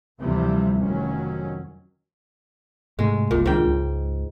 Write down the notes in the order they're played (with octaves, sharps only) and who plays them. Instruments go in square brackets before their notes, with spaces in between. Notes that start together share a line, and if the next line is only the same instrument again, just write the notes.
[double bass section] D2 C3 E3 F3 G3
F1 D#3 F#3 C#4
[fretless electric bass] G#2 C3 A3 [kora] G#3
[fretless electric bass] F#1 C2 [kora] A#2
[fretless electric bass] C2 D#3 D4 [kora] G#2 G5
[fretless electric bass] C#2